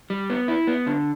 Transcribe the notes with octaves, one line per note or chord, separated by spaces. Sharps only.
G3
B3
E4
B3
D3